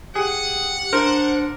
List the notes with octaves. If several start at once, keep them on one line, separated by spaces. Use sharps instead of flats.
G4 G#4 F#5
D4 A#4 C5